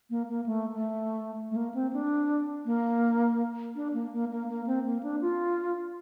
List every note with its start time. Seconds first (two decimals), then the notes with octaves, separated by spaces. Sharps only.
0.10 A#3
0.28 A#3
0.46 A3
0.74 A3
1.51 A3
1.56 A#3
1.74 C4
1.93 D4
2.65 A#3
3.75 D4
3.94 A#3
4.12 A#3
4.31 A#3
4.49 A#3
4.67 C4
4.86 A#3
5.03 D4
5.21 F4